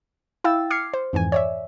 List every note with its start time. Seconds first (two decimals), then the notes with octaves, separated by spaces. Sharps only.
0.44 E4 F5 G5 E6 A6
0.70 D6 F6 G#6 C7 C#7
0.94 C5
1.13 F2 G#2 E3 G#5
1.32 C#5 D5 E5